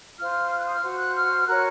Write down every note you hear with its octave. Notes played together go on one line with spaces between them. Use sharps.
F4 C5 F6
F6
F#6
D#6
F6
F#4 C5
F#6
F6
F#4 A#4 C#5 F#6